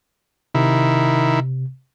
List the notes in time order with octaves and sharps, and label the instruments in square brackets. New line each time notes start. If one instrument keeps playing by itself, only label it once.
[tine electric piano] C3 [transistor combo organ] D#3 E4